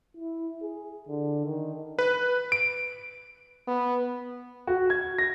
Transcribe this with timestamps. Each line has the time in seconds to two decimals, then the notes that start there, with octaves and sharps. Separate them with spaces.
0.17 E4
0.62 G#4
1.08 D3
1.46 D#3
1.99 B4
2.52 D7
3.67 B3
4.67 F#4
4.90 G#6
5.18 A#6